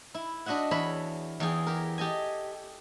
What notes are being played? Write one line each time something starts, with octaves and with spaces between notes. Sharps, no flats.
E4
D4 F#4 D#5 E5 F#5
E2 C#5 E5 B5
E2 E3 G#4 G5
G4 A#4
G4 A4 D#5 G#5